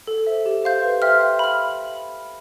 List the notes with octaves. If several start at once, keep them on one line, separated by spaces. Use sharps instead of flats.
A4
C5 E5
G4
C5 F5 C6 G6
B4
E5 G5 C6 F6
F5
B5 F6